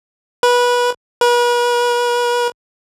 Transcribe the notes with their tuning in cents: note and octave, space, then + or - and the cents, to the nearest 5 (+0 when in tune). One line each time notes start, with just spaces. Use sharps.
B4 -20
B4 -40